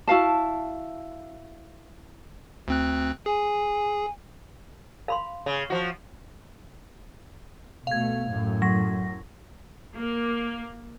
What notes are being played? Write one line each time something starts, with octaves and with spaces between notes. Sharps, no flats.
E4 F#4 F5 A5
D2 C4 F#6
G#4 G#5
F5 B5 C6
C#3
F3 F#4
B2 A3 F5 G#6
F#2 A2
F#3 A#6
A#3